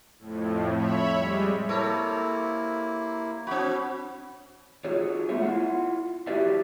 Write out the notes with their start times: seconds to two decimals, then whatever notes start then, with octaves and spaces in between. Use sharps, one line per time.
0.19 F2 A2
0.74 C#5 E5 B5
1.16 G3 G#3
1.69 C3 A#3 E4 A4 C#5
3.47 C4 F#4 B5
4.84 F4 F#4 G#4 C#5
5.29 G#3 A3 B3 F4 C#5 E5
5.42 E4 F4 F#5
6.27 E4 F#4 G4 B4 D5 E5